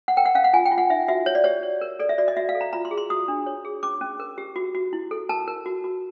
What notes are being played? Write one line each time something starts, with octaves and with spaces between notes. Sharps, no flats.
F#5
A#4 G5
F#5
C#4 F5
F#5
F4 G#5
G5
F4
F#5
D#4 E5
F#4 E5
C#5
D5
G4 C#5
C#5
A#4
A4 D5
E5
F#4 D5
D#5
F#4 E5
F5
A4
A#5
F4 A#5
C6
G#4
C6
F#4 D#6
D4
C#5
G#4
C#4 D6
C#4
A#4
G4
F#4
F#4
E4
A4
A#4 A5
A#4
F#4
F#4